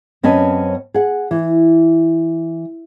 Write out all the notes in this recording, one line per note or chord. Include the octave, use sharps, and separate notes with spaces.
F#2 C4 C#4 B4 D#5 A5
G#4 F#5
E3